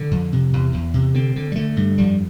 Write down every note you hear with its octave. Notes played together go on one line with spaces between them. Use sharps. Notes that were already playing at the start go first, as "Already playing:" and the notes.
Already playing: D3 D4
F2
C3
E2
E2
C3
D3 C4
D3
G3
D3 A3
G2
F2 G3